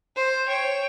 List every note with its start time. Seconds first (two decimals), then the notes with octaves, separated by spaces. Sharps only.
0.16 C5
0.48 C#5 G5